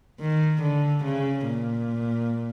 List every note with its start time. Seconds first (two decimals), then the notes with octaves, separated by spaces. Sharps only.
0.21 D#3
0.63 D3
1.04 C#3
1.46 A#2